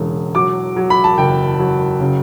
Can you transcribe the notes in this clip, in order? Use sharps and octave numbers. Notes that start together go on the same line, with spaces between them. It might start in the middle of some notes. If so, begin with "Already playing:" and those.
Already playing: E1 E2 C#3
F#3 D6
F#3
B5
A5
F#1 G5
F#3
C#3